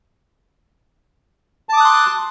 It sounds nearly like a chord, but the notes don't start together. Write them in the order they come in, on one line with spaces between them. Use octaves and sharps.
A5 D6 D#6 F#6 C6